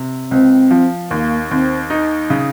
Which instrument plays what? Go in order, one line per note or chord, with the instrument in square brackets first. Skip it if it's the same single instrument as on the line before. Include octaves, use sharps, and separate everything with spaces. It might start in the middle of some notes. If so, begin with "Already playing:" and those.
Already playing: [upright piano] C3
[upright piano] C#2 [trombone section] C4
[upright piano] F3
[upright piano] D#2 [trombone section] A#3
[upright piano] D#2 [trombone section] C4
[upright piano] D#4
C#3